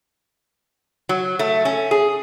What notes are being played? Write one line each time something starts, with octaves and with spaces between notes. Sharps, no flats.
F#3
A3
C#4
G#4